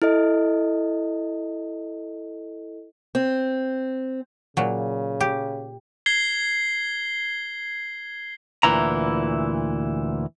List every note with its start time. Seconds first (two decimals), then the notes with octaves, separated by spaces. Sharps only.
0.02 E4 A4 D#5
3.15 C4
4.57 A#2 C#3 F#3
5.21 G4
6.06 G#6 C7 G7
8.63 D2 A#2 E3 E4 A#5